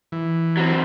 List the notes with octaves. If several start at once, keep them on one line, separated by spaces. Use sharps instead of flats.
E3
F#3 C4